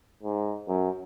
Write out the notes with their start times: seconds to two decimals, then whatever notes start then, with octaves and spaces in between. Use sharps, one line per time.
0.23 G#2
0.68 F#2